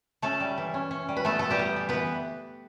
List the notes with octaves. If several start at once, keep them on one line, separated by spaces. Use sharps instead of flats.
A3 C#4 A4
G3
E3
C#4
C#4
G3
B4
A3 B3 A4
B3 A4
G3 G4
B3
E3
E3 B3 B4